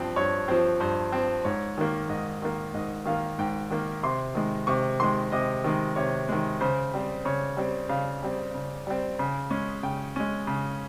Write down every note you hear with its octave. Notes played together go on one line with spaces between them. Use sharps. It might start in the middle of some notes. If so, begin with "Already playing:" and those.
Already playing: G2 F3 C4
G2 C#5
F3 C4 C5
G2 C5
F3 C4
G#2 C#5
D#3 A#3
G#2 D#5
D#3 A#3
G#2 D#5
D#3 A#3 F5
G#2 G5
D#3 A#3
C3 C6
D#3 G#3
C3 C#6
D#3 G#3 C6
C3 D#5
D#3 G#3
C3 C#5
D#3 G#3
C#3 C5
G3 C4
C#3 C#5
G3 C4
C#3 F5
G3 C4
C#3
G3 C4
C#3
G#3 C#4
C#3 G5
G#3 C#4
C#3